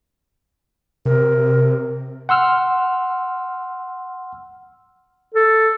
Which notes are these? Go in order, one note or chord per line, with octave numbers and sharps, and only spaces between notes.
C3 A#4
F#5 C6 E6 F6
A4